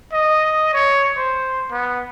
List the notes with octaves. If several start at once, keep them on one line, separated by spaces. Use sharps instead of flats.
D#5
C#5
C5
B3